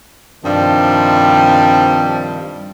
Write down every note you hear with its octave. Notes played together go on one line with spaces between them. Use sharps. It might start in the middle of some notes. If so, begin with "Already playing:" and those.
G2 C3 D#3 F3 G3